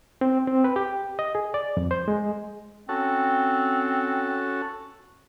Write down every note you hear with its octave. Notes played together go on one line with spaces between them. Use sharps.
C4
C4
B4
G4
D#5
G#4
D5
F2
C5
G#3
C4 C#4 F#4 A4